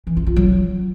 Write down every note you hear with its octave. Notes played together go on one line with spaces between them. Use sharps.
E3
E4
F4
F#3